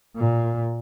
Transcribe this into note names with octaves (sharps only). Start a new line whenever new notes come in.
A#2